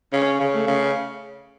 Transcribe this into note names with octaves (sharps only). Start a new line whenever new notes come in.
C#3 C#4
C#3
A3
C#3